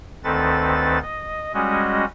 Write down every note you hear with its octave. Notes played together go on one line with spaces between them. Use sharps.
D2 D#3 C4 A4 B4 A6
D#5
G3 G#3 C#4 F#4 D#5